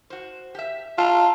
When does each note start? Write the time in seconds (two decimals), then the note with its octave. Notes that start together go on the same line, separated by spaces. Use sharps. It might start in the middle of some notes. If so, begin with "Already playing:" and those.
0.10 F#4 C5
0.55 G4 E5
0.98 F4 A5 A#5